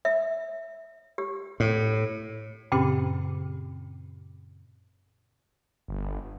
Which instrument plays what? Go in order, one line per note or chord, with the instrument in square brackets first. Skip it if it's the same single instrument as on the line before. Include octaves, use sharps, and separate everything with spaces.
[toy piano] E5
G4
[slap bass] A2
[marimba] F#2 A#2 C#3 C4 C#4 G4
[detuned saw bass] G1